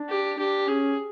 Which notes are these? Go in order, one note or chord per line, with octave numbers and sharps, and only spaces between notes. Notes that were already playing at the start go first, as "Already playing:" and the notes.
Already playing: D4
G4
D4 G4
C#4 G#4